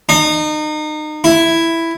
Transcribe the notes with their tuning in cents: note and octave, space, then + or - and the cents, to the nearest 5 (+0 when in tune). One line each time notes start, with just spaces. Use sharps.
D#4 -30
E4 +5